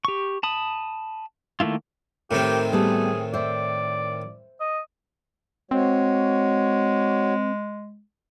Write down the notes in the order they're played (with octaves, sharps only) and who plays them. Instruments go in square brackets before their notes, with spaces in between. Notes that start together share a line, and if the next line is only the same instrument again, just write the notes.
[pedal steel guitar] G4 C#6
A5 B5 D#6
D#3 A3 A#3 E4 F4
[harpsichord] A2 D#3 C4 [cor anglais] G4 [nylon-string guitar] A#4
[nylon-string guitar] G3 A3 B3 [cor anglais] G#4
[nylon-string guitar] C5 E5 [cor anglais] D5
[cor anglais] D#5
[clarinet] G#3 [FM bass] C4 [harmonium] F#4 C#5